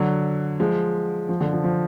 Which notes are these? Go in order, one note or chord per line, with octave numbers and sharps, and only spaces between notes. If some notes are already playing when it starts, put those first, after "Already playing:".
Already playing: D3 F#3
F3 G#3
F3
D3
F3
F3